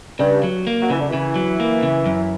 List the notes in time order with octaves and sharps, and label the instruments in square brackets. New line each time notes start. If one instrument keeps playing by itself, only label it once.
[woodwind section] G2 [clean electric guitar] C#3
[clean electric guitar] F#3
A#3
[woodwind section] F#3
[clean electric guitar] C#3 [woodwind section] E3
[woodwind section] D3
[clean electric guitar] C#3 [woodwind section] E3
[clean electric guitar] F#3
A#3
C#3
F#2